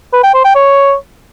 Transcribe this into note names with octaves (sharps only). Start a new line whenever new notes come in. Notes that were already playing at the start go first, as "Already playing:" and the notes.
B4
G5
C5
G5
C#5